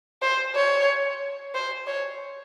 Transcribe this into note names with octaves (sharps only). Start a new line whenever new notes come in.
C5
C#5
C5
C#5